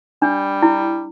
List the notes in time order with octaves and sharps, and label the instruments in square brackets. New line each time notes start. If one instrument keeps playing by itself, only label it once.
[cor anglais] G3 [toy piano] D4
[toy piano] E4